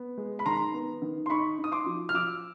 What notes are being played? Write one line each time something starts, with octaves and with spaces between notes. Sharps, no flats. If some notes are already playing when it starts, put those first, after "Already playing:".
Already playing: B3
G#3
B5
D#3 A#5 C6
B3
D#3
C6
D#4 B5 C#6
D#4
D#6
C6 D6
F3
F6
F3 D6 E6